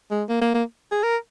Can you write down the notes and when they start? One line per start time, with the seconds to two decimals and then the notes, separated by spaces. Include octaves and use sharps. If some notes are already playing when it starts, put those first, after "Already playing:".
0.11 G#3
0.29 A#3
0.41 A#3
0.54 A#3
0.92 G#4
1.03 A#4